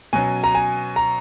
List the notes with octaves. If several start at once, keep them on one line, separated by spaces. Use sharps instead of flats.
B2 F#3 C#4 G#5
A#5
G#5
A#5